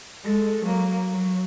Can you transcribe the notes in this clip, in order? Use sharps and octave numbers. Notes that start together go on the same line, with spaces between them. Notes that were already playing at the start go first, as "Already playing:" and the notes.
G#3 A4
F#3 A#3
F#3